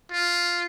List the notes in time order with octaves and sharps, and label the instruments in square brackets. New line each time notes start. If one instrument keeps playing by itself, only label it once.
[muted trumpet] F4